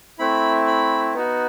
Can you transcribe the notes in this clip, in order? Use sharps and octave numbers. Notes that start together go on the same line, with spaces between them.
A3 C4 E4 B5
B5
B3 D#4 F#4